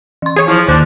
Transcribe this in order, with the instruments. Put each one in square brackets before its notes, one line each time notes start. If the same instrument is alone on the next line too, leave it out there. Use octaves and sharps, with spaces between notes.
[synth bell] E3 C6
[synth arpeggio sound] G#4 C#5
[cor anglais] F3 [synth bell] E4
[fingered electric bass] D#2 [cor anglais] D4 [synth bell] C5 G6